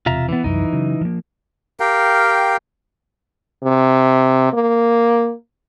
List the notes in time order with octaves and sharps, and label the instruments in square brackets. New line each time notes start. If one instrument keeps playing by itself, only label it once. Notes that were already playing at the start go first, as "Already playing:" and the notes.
[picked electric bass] E1 C3 [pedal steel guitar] F4 E5 A#5
[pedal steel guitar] E3 B3
[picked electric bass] C2 F#2 [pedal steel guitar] E3 D#4
[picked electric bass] C#3 F#3
F3 A#3
[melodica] G4 A#4 F5 G5
[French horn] C3
A#3